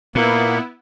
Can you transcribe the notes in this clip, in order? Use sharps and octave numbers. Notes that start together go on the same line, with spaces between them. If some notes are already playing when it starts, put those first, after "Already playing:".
A#2 A#3 B3 E4